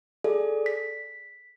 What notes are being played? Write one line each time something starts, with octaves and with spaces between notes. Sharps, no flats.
G#4 A4 D5
B6